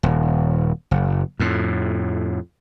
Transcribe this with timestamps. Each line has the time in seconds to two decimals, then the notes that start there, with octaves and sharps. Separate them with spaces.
0.03 D#1
0.91 F#1
1.40 F2 A2